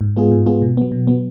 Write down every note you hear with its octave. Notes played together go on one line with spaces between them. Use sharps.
G#2
G#3 B3 F4 G#4
G#2
G#3 B3 F4 G#4
B2
F#3 B3
B2
F#3 B3